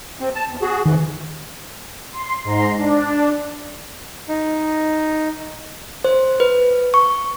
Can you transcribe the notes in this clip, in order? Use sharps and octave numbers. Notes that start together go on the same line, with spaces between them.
C3 C4
A5
E2
F#4 G#4
F2 D#3 E3
C6
G#2 A#5 C6
D4
D#4
C5
B4
C#6